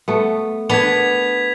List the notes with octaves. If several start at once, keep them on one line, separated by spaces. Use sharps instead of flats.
A3 B3
B3 D4 G#6 B6 F7